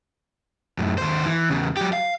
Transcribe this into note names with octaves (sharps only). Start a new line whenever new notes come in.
F#2 A2
D#2 C5
E3
E2 C#3
F#3 G4
F5